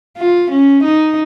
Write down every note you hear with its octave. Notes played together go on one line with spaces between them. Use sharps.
F4
C#4
D#4